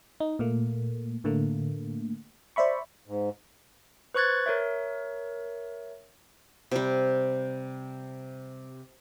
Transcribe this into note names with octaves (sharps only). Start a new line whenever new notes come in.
D#4
A#2 A3 A#3
A2 D3 A3 A#3
C5 D5 E5 B5 C#6
G#2
B4 C5 C#6 F#6 G#6 A6
A#4 C#5 E5
C3 G3